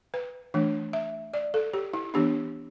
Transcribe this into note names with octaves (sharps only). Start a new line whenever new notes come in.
B4
E3 A3 D4
E5
D5
A4
G4
E4
E3 B3 D4 G4